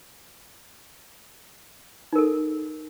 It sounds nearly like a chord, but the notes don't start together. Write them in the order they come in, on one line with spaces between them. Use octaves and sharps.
D#4 A#4 A4